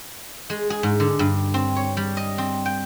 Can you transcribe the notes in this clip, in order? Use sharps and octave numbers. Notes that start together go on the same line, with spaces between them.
G#3
G#4
G#2
D3
G2
C4
C#5
G3
D#5
C4
G5